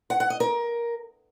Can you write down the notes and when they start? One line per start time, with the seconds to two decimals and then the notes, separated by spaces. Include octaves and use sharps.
0.10 F#5
0.20 F#5
0.30 D#5
0.40 A#4